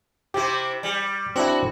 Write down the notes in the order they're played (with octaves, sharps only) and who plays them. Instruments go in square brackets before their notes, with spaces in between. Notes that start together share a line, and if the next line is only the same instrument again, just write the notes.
[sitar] C3 C4 E4 [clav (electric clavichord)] G4
[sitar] G3
[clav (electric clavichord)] C4 D4 E4 [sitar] F#4